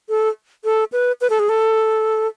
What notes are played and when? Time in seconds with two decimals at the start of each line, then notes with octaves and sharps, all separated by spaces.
0.09 A4
0.64 A4
0.92 B4
1.21 B4
1.30 A4
1.39 G#4
1.49 A4